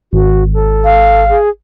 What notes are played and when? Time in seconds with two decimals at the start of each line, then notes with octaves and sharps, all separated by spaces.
0.13 G#1 F#4
0.54 A4
0.85 F5
1.29 G#4